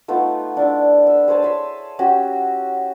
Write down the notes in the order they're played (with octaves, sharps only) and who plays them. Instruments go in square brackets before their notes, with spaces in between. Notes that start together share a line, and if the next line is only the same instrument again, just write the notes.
[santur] A3 B3 D#4 F4
D4 E4
E5
G#4 C5 C#5 A5
C#5 E5 C6
C#4 F#4 G4